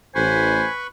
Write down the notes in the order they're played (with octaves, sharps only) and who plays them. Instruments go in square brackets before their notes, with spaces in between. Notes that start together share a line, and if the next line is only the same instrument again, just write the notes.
[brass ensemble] A1 [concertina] B4 B5 C#6 [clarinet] C5 [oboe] G#5